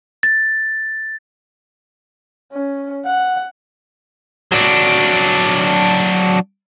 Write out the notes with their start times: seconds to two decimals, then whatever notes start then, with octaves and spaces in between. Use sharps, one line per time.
0.23 A6
2.53 C#4
3.06 F#5
4.52 F#3 D4